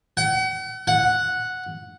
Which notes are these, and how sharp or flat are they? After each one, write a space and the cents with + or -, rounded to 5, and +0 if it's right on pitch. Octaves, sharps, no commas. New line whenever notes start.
F#5 +40
F#5 -5